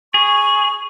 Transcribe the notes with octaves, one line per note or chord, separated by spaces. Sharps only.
G#4 C#6